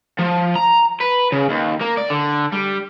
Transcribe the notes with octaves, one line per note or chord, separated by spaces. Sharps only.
F3
A#5
B4
C#3
D#2
A#3
D5
D3
G3